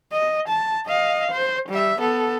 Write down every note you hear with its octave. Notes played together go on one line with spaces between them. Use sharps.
D#5
A5
D#5 F5
C5
G3 E5
B3 A4